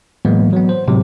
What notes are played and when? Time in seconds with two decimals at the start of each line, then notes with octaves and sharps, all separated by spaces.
0.25 A2 E3 F#3 G#3 A#3 B3
0.53 F#3 B3
0.69 C5
0.88 A2 C3 F#3 G#3